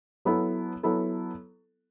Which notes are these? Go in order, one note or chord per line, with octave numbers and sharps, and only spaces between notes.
F#3 B3 E4 A4
F#3 B3 E4 A4